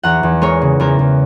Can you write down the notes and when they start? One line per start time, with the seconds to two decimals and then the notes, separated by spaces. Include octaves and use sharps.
0.03 E2 F#5 A#5
0.23 E2
0.42 G#3 A#4 C#5
0.62 C#3
0.80 E2 A#4
0.99 E2